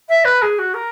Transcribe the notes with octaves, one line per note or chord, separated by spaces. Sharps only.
E5
B4
G#4
F#4
A#4